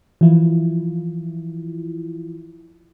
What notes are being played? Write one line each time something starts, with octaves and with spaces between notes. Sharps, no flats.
E3 F3 E4 F4